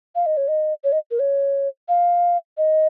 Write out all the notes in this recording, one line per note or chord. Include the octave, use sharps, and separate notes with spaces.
F5
D#5
C#5
D#5
C#5
D#5
A#4
C#5
F5
D#5